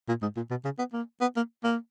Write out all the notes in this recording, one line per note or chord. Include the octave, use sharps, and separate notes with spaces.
A#2
G#2
A#2
B2
C#3
B3
A#3
B3
A#3
A#3